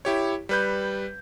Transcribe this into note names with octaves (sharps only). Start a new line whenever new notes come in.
E4 G4 C#5
G3 B4 G6